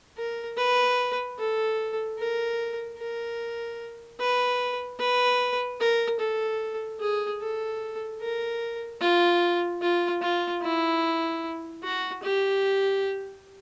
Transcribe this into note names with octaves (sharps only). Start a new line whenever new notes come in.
A#4
B4
A4
A#4
A#4
B4
B4
A#4
A4
G#4
A4
A#4
F4
F4
F4
E4
F#4
G4